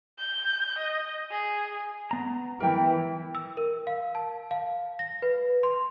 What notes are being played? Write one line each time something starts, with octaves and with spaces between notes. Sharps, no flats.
G6
D#5
G#4
B3 A#5
E3 A#4 G5
E6
A#4
F5
A5
F5
A#6
B4
C6